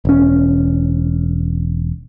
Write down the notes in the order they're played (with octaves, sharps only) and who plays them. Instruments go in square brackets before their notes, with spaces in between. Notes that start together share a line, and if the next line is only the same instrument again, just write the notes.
[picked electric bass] E1 C#4